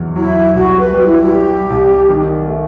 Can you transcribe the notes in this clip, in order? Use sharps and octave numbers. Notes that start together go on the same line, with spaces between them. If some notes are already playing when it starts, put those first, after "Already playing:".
Already playing: E2 F#3
F#3 E4
C2 F#4
B4
G3 F#4
E4
F#4
G3 G4
C2
D#3
A3